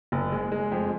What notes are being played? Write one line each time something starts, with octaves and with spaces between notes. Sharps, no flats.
F#1
G#3
G#3
F2